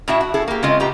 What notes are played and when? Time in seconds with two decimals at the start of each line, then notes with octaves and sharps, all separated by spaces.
0.08 A2 E4 F#4 E5
0.21 F#4
0.34 E4 G#4 A4
0.48 A#3 G4
0.63 C#3 G#3 C4 F4 D#5
0.80 A2 B3 G4 A#5